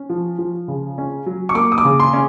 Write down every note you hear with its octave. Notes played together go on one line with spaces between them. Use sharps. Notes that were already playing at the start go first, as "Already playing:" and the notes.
Already playing: C#4
F3
F3
C#3
C#4
F#3
C#6
A#3 D6
D#6
D6
C#3
C6
C#4